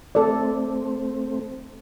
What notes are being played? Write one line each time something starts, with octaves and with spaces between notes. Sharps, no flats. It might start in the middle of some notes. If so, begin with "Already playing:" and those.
A3 C4 A4 D5